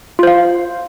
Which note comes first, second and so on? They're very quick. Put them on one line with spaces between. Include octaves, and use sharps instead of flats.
F4 C5 F5